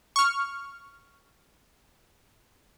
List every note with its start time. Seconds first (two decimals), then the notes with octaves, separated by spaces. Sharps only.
0.16 C#6 F6